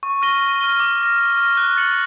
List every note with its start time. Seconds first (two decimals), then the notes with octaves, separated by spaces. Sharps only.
0.03 C#6
0.22 F6 A#6 D#7 G7
0.41 C#6
0.61 F6 A#6 D#7 G7
0.80 D6
1.00 F6 A#6
1.19 D6
1.38 F6 A#6
1.57 F#6
1.76 A6 C#7 F#7